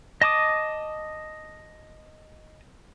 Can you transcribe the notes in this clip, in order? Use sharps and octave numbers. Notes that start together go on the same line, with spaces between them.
D#5 A5 D6 D#6